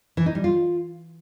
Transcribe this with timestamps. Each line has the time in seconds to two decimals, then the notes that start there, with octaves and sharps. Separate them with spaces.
0.17 E3
0.26 D#4
0.35 G3
0.44 F4